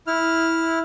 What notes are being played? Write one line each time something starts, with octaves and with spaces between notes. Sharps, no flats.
E4 F6